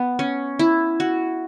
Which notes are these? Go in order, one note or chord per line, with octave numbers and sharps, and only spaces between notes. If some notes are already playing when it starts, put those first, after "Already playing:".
Already playing: B3
C#4
E4
F#4